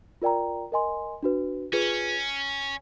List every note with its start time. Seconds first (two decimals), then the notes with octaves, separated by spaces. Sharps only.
0.22 F4 A#4 D5 G5 A#5
0.72 A#4 D#5 G#5 C6
1.23 D4 F#4 B4
1.73 C#4 F4 G#4 B4